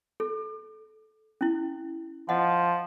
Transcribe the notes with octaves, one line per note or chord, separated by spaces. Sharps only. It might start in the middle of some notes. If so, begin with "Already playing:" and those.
A4
C#4 E4
F3 D#5 F#5